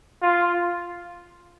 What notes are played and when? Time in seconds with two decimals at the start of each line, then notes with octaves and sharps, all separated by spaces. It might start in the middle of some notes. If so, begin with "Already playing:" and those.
0.22 F4